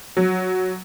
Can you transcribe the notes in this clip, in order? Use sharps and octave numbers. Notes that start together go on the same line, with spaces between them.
F#3